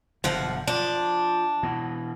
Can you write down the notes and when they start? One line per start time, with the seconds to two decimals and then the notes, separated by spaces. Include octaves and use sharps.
0.24 F#1 B2 D3 F3 F#5
0.68 F3 D4
1.63 B2 E3